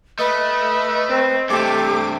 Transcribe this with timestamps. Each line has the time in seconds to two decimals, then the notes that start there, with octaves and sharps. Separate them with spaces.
0.19 A3 B4 D#5
1.09 C4
1.50 G2 C3 A3 G4 D6